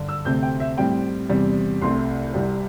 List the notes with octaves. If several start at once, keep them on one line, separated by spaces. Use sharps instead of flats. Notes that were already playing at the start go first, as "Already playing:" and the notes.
Already playing: G2 D3
E6
D2 C3 A3 C4 G6
G5
E5
A2 G3 C4 G5
E2 C3 G3 C4
C2 C3 A3 C4 C6
C2 C3 G3 C4